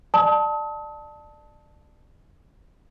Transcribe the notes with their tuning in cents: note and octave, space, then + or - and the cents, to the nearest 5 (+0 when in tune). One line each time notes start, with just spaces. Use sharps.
D5 +25 A5 +0 D#6 +40